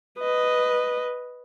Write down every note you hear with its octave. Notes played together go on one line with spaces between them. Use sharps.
B4 D#5